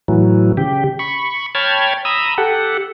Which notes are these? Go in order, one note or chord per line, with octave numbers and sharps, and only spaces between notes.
A2 E3 F#3
C#3 G4
B5 C#6
C#5 G5 A5 B5 F6 G#6
A#5 B5 D#6 E6
G4 A4 F#5